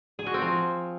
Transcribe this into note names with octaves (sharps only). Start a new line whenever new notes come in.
G#4
F#4
C4
F3